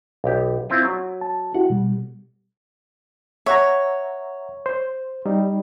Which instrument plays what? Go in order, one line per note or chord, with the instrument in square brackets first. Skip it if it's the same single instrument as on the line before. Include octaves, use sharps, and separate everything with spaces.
[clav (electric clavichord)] B1 G4
C4 E4 F4
F#3
[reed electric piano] A5
[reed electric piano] E4 F#4 G4 [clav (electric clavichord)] F#5
[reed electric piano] B2 G3
[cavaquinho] C#5 [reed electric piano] E5 F#5 A#5
[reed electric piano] C5
G3 D#4